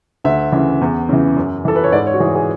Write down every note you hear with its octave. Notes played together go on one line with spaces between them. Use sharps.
D2 E5
C#3 E3
E2
C#3 E3
F#2
E3 A4
B4
C#5
G#2 D5
C#5
F#4
E3 G#4
G#4